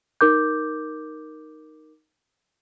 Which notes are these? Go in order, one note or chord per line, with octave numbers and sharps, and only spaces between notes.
D#4 A#4 D6 G6